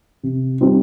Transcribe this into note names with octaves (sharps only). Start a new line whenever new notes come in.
C3
G3 C4 D#4